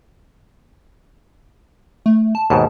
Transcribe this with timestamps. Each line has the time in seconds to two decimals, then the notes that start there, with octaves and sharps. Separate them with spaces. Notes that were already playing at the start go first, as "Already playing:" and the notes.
2.06 A3
2.35 A5
2.50 D#2 G#2 B2 A5